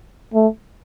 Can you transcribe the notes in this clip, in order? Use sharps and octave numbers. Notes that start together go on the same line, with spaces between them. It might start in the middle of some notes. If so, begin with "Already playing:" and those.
A3